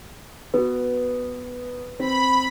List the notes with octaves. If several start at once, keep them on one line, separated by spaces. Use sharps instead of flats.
B3 F#4 B4
C4 B5